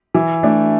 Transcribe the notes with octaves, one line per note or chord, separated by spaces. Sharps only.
E3
A3 D4